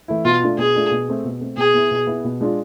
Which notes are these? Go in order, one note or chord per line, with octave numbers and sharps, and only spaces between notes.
E3 A3 E4
B2 F4
A3 D4 F4
B2 G#4
A3 D4 F4
B2
A3 C4
B2
A3 C4
B2 G#4
B3 E4
B2
B3 E4
B2
G#3 D4 F4